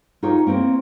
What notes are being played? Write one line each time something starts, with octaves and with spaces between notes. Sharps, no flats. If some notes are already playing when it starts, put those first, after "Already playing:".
D#4 F4 G4 C#5
A#3 C4 E4 C#5